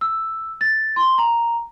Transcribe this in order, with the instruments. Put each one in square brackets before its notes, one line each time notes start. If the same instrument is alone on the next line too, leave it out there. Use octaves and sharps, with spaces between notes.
[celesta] E6
A6
C6
A#5